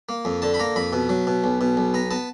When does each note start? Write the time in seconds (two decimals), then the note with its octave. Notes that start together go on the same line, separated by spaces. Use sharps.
0.09 A#3
0.25 F2
0.42 D3 A5
0.54 B5
0.59 A#3 A#5
0.76 F2 B5
0.93 B2
1.09 F#3
1.27 B2
1.44 B1
1.61 B2
1.77 B1
1.94 B3 A#5
2.11 B3 A5